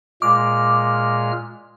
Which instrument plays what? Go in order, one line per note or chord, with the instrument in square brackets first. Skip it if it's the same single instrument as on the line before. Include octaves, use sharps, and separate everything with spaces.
[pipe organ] A#2 G#3 F6 [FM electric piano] D6